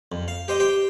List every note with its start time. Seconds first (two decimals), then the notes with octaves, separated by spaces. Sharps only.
0.12 F2
0.28 F5
0.48 G4 C5 D#5
0.60 G4 C5 G5